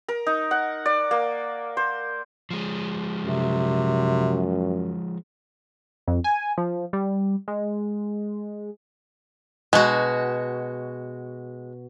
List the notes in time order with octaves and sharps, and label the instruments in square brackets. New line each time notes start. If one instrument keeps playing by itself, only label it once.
[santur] A#4
D#4
F#5
D5
A#3
C5
[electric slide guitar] F3 G#3
[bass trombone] F#2 [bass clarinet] C3
[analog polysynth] F2
G#5
F3
G3
G#3
[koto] B2 F#4 [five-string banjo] G#3